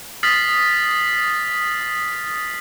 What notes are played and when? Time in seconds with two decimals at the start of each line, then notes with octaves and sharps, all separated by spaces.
0.23 D#6 F6 A6 B6 C7 F#7